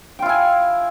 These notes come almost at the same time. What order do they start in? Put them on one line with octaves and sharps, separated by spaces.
G5 F4 E4 G#5